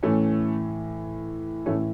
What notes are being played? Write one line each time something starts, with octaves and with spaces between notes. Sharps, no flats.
A2 E3 A3 C#4
A2 E3 A3 C#4